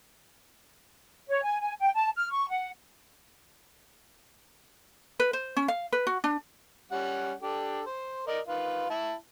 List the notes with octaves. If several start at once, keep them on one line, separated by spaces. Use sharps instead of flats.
C#5
G#5
G#5
G5
A5
F6
C#6
F#5
B4
C5
C#4
F5
B4
F#4
D4
G3 C#4 F#5
D4 G4 A4
C5
A#4 D5 D#5
D#3 F4 B4
E4 A5